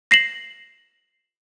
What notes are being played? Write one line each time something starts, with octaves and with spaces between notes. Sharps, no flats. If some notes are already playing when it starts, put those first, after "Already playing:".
A#6 C7 E7 F#7